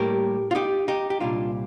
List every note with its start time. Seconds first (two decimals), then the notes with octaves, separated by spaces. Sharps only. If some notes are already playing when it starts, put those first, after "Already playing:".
Already playing: A2 G3 A#3 G4 A#4
0.51 F4
0.55 D#4 G4
0.88 D#4 G4
1.10 G4
1.20 C2 A#2 G3 D4 F4